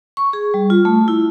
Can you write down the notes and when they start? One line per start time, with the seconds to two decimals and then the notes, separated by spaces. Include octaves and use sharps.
0.17 C#6
0.33 G#4
0.54 G3
0.70 F4
0.85 A3
1.08 E4